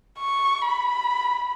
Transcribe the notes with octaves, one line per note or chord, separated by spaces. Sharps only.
C#6
B5